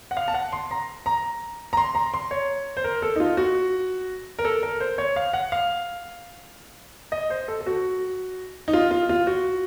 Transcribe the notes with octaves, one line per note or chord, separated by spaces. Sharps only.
F#5
F5
A5
F#5
C6
A#5
A#5
A#5
C6
A#5
C6
C#5
C5
A#4
A4
D#4
F4
F#4
A#4
A4
A#4
C5
C#5
F5
F#5
F5
D#5
C5
A4
A4
F#4
D#4
F4
F4
F4
F#4